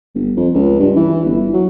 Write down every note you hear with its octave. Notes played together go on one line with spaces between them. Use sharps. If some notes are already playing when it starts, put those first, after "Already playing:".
G1
F2
C#2
G2
E3
G1
F#3